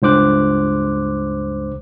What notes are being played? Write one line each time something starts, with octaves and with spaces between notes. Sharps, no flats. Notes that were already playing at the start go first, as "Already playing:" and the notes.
C#2 G2 C5 D6 F#6